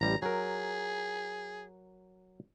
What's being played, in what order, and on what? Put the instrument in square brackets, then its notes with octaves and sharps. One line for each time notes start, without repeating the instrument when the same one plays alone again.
[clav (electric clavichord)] A1 G3 [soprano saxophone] A#5
[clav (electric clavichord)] F#3 A#4 [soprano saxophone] G#4